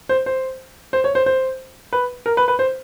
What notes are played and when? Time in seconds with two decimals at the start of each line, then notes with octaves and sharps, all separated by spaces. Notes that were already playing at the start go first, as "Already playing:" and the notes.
0.09 C5
0.26 C5
0.93 C5
1.04 C#5
1.15 C5
1.26 C5
1.93 B4
2.26 A#4
2.37 B4
2.48 B4
2.59 C5